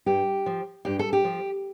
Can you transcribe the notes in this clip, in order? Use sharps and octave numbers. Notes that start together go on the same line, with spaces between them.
G2 G4
F3
G2 G4
A4
G4
F3